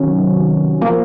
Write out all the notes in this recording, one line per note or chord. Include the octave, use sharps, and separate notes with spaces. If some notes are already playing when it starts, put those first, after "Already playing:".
Already playing: C3 D#3 F#3 C#4
F3 A#3